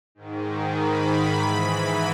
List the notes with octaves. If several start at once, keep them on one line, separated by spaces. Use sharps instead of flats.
G#2 D#3
B5
G#2 E3